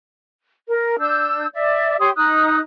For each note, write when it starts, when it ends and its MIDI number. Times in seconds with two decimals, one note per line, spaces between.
0.68 0.96 70
1.00 1.46 62
1.00 1.46 88
1.00 1.46 91
1.54 1.95 74
1.54 1.95 76
1.99 2.10 67
1.99 2.10 73
1.99 2.10 84
1.99 2.10 87
2.16 2.59 63
2.16 2.59 87
2.16 2.59 90